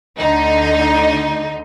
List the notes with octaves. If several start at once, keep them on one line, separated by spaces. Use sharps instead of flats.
D2 D3 D#4